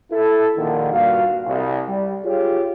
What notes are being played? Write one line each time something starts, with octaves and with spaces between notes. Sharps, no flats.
E4 A4
A#1 A#2 D3 D#3
G2 A#2 F#4 F5
C2
G3
F4 G4 G#4 C#5